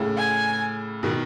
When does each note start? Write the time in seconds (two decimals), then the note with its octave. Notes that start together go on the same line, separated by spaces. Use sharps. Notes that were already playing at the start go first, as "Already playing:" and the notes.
Already playing: A2 C#3
0.17 G#5
1.03 B2 D#3